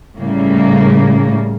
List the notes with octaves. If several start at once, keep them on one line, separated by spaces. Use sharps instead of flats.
A2 C#3 G3 A3 A#3